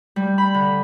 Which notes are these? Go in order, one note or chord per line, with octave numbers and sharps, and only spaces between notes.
G3
B5
D3